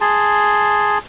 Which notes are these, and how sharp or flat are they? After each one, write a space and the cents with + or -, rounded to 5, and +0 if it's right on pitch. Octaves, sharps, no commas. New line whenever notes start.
G#4 +0 A5 +0 C6 +0